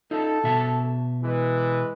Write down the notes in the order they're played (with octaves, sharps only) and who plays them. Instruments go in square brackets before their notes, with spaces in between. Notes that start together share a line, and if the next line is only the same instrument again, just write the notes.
[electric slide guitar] D#4 F4 [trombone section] A4
[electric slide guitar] B2 E5 A5
[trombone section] E3 G#3 B4